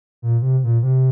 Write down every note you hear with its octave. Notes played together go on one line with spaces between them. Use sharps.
A#2
C3
A#2
C3